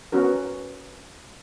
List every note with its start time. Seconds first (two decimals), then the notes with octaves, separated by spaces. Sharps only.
0.12 B3 C#4 F#4 A#4